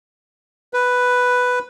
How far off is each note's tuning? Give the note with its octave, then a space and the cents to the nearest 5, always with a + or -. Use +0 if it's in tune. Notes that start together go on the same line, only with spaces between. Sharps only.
B4 +5